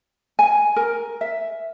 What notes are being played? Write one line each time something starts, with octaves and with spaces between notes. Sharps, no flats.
G#5
A#4
E5